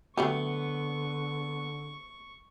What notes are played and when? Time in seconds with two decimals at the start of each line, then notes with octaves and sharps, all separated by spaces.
0.17 D3 F#3 A3 B3 G4 C#6